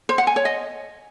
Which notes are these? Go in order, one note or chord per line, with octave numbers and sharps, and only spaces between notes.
C5
F#5
G#5
C#5
D#5